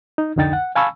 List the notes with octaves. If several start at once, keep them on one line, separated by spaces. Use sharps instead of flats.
D#4
C2 F2 D3 D#4 G5 A6
F#5
F5 G#5 A5 B5 C#6 E6